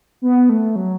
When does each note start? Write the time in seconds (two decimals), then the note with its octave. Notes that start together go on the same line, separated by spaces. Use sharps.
0.22 B3
0.49 A3
0.76 F#3